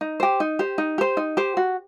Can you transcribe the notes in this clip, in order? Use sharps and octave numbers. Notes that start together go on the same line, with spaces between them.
D#4
G4 C5
D#4
G4 C5
D#4
G4 C5
D#4
G4 C5
F#4